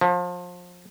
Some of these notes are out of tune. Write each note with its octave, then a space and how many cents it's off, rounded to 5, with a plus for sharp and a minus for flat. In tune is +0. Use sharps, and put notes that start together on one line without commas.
F3 +30